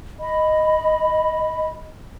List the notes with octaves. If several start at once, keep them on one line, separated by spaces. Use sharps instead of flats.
D#5 B5